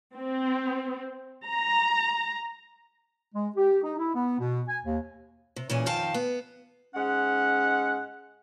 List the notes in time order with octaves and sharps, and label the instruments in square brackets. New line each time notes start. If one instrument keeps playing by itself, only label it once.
[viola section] C4
A#5
[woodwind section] G#3
G4
D#4
E4
B3
B2
G#5
D#2
[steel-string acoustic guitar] C3
A#2 E3 C#4 G#4
F2 D#3 F5 G5 A5
B3
[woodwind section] G#2 G#3 C#4 F#5